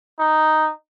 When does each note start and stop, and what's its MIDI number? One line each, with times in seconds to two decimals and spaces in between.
0.19 0.71 63